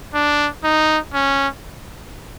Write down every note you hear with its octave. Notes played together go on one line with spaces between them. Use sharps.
D4
D#4
C#4